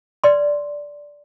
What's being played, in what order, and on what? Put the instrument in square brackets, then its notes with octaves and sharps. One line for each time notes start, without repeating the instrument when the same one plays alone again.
[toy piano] B4 D5 C6